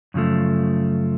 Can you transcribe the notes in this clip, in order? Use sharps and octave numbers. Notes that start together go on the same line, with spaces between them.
F#2 C#3 F3 A3